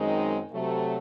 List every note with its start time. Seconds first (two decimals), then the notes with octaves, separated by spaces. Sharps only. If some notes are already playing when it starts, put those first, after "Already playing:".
Already playing: F#2 D#3 G#3 C4 D#4
0.52 C3 F#3 A3